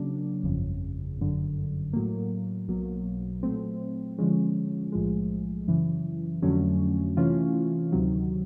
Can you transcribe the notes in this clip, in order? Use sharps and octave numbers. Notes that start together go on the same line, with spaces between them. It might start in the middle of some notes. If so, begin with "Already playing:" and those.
Already playing: C#3 F#3 A#3 D4
G1 F2 C#3
G1 F#2 D3
A2 F#3 A#3
B1 B2 F#3 A#3
A#2 F#3 A3 C4
D3 F3 G#3 C#4
B1 A2 F3 G#3
F#2 C#3 E3
F2 D3 F#3 A3 C#4
C3 E3 A3 C#4 F4
D2 C3 D#3 F#3